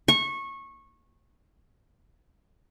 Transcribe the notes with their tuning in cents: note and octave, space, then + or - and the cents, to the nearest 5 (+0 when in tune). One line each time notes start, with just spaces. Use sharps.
C#6 -20